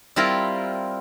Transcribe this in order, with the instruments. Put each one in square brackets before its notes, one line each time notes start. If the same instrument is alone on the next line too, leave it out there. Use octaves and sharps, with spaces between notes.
[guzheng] G3 C4 E4 F4 A#4